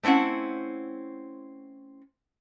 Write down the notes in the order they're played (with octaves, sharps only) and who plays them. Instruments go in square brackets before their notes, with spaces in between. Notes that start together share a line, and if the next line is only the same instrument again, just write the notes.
[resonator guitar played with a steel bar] A3 C4 C#4 E4 F#5